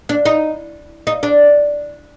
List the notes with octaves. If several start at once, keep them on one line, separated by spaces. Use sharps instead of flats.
D4
D#4
D#4
D4